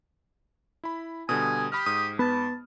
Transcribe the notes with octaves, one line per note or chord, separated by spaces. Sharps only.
E4 B5
B2 D3 G3 G#5 D#6
G4 B5 D#6 F6
G#2 D#6
B3 A5